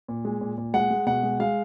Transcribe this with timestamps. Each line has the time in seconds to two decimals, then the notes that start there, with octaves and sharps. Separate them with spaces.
0.08 A#2
0.25 G#3
0.41 A#2
0.58 A#2
0.74 G#3 F#5
0.90 G#3
1.06 B2 F#5
1.23 G#3
1.40 G#3 F5